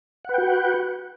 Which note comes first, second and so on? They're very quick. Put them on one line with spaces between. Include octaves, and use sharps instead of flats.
F#5 B4 G5 F#4